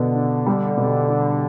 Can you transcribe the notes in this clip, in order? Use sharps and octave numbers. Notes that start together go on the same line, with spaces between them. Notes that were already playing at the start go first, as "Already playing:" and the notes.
Already playing: B2 D3 B3
D4
G3
B2
D4